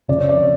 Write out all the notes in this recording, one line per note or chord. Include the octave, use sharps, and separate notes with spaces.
F2 C#3 F3 D5
C#5
D5